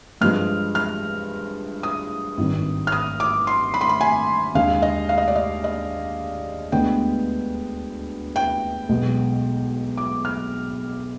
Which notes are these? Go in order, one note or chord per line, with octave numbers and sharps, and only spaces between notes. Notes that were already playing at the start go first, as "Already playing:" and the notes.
G2 F3 G#3 F6
F6
D#6
G#1 G2 D#3
F6
D#6
D6
C6
B5
C6
B5
G#5
D#2 D3 G#3 F5
D#5
F5
D#5
D5
D#5
D#5
D2 D3 G#3 B3 G5
G5
B1 B2 G#3
D6
F6